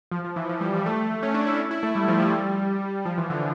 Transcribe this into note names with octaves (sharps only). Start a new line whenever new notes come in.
F3
F3
E3
F3
G3
G3
A3
C#4
D4
E4
E4
A3
G3
F3
G3
F3
E3
D3